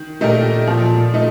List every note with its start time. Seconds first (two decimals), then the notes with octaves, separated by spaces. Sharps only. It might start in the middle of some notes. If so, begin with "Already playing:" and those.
Already playing: D#3
0.21 A#2 A3 D#4 G4 A#4
0.67 A#2 F3
1.14 A3 D#4